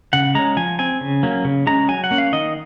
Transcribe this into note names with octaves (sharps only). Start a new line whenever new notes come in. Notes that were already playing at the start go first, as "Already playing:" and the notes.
C#3 F#5
G#3 C#4 A#5
F3 G#5
C4 G#5
C#3
F#3 A#3 C#4
C#3
G#3 C#4 A#5
F#3 G#5
F#5
A#3 C#4
F5
D#3 D#5